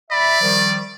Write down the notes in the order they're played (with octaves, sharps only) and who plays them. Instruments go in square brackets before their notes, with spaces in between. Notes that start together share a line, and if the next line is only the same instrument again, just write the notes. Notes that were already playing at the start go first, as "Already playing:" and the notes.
[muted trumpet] D5 [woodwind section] E5 B5
[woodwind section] D#3 F3 G3